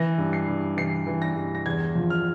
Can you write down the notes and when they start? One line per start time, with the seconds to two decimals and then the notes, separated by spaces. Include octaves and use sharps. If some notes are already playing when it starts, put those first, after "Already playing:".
Already playing: E3 A#6
0.18 G2
0.33 C7
0.48 G2
0.77 E3 C7
1.07 E3
1.22 A#6
1.36 G2
1.55 A#6
1.66 E2 G#6
1.95 F3
2.10 F6